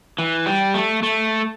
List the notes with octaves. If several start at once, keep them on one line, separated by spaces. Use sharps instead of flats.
E3
G3
A3
A3